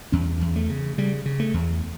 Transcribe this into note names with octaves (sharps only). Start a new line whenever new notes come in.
E2 C#4
E2
A3
C#3
C#3 G3
C#3
A3
E2